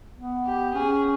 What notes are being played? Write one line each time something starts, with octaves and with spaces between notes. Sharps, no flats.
B3
G4
C#4 G#4